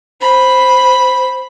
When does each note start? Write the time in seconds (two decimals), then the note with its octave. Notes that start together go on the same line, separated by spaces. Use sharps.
0.21 C5 B5